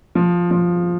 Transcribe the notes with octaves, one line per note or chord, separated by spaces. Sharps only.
F3
F3